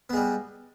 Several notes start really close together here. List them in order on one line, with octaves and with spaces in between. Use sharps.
B3 G#3 G3